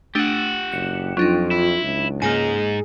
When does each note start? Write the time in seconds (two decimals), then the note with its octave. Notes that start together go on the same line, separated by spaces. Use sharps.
0.15 A3 D4 G4 F#5 D#7
0.72 F#1 F#6 C#7 E7
1.17 F2 F#3 D4 D#4 F4
1.51 E4
1.83 C#2
2.22 G#2 A#3 D#4 G#4 G#5